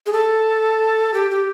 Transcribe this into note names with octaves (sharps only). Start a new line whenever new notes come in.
G#4
A4
G4
G4